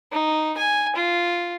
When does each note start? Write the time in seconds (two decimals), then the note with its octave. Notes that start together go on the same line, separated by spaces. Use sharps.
0.12 D#4
0.57 G#5
0.96 F4